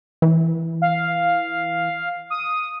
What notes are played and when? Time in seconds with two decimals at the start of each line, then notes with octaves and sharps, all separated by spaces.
0.22 E3
0.82 F5
2.30 D#6